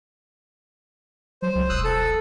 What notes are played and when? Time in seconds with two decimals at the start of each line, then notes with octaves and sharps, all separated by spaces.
1.42 F#3 C5
1.55 C#2
1.69 E1 D#6 E6 F#6
1.84 A4